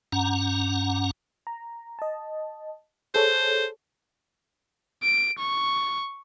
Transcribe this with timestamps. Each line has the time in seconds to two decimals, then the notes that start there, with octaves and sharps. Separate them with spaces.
0.12 G2 C#4 F#5 A#5
1.47 A#5
1.99 D#5 A5
3.14 G#4 A4 C5 C#5
5.03 D7
5.39 C#6